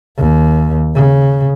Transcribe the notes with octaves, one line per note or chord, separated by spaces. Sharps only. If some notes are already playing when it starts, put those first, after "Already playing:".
D#2
C#3